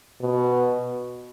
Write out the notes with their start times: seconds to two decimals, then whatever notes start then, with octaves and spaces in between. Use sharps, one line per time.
0.21 B2